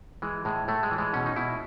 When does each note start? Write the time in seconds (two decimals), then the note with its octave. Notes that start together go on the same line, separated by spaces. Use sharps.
0.22 E3 G#3
0.45 A2 G#3
0.68 A2 A3
0.83 G#3
0.91 E3
0.98 G#3
1.13 B2 C#4
1.26 D#4
1.36 B2 E4